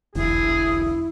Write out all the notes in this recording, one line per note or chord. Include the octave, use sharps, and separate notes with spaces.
F1 B1 E2 D3 E4 G#4